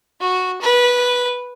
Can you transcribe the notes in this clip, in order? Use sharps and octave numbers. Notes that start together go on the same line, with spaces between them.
F#4
B4